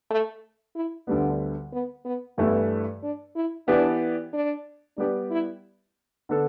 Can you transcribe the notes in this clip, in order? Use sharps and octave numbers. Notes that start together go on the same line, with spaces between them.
A3
E4
D2 D3 G3 B3 D4
B3
B3
G2 E3 A3 B3 E4 B4
D4
E4
E3 B3 D4 G4 D5
D4
G3 B3 D4 G4 D5
E4
D3 B3 D4 A4